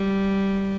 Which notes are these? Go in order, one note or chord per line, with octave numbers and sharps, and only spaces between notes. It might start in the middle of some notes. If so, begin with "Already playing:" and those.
Already playing: G3